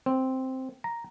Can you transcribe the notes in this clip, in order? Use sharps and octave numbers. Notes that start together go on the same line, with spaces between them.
C4
A#5